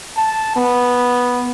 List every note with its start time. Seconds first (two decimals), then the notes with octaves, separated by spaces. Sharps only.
0.17 A5
0.56 B3